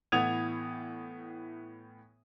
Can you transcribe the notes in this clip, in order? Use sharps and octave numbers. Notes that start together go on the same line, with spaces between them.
A2 E3 B3 D#6 G#6 F7